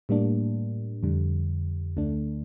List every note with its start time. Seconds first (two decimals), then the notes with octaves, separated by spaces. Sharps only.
0.09 A2 G3 A#3 D4
1.03 F2 D3 G3
1.97 D2 D3 A3 D4